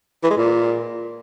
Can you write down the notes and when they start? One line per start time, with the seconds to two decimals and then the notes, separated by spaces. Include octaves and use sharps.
0.24 E3
0.30 G#3
0.37 A#2